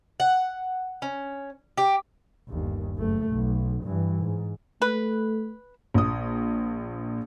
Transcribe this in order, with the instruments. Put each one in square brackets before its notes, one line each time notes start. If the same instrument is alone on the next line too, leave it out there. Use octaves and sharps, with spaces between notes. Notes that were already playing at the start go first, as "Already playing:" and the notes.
[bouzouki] F#5
C#4
G4
[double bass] G1 D#2
F#1 A3
B1
G2 E3
G#2
[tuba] A3 [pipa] B4
[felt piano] A#1 D#6